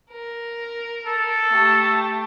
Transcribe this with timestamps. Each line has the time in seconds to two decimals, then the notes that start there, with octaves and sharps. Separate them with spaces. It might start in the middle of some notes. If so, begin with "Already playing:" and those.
0.11 A#4
1.07 A4
1.51 A3 G4